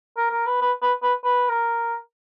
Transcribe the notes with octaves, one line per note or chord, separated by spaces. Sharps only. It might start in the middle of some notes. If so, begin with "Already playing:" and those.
A#4
A#4
B4
B4
B4
B4
B4
A#4